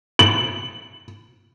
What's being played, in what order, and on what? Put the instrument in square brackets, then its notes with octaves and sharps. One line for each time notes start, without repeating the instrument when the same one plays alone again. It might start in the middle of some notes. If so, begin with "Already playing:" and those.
[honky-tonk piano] F#7